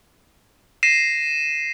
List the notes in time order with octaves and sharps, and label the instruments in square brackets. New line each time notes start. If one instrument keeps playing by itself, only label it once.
[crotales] A#6 C7 D#7 E7